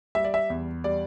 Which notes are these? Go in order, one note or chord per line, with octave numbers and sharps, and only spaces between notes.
G3 E5
D5
E5
E2
G3 D5